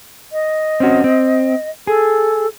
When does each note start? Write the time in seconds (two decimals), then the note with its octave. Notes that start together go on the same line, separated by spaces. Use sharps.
0.32 D#5
0.80 C4 C#4 F#4
1.04 C4
1.87 G#4 A4